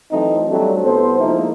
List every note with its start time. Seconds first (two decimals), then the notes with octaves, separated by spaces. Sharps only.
0.12 E3 F#3 A3 C4 D#4
0.49 F#3 G3 A3 C4 D4
0.83 C2 B3 A4 C5
1.19 F3 G#3 A#3 D#4 E4